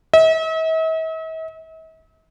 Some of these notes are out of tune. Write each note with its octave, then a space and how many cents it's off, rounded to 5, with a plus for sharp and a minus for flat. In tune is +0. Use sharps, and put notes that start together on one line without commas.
E5 -45